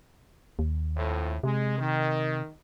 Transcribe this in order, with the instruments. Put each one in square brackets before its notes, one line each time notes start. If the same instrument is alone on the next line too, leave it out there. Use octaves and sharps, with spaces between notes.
[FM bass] D#2
[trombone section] F2 A2
[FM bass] C3 [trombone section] G#3
[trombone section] D#3